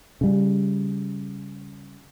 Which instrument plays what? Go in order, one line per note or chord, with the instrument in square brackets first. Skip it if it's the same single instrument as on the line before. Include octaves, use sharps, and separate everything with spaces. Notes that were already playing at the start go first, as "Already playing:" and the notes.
[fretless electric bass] C#3 G3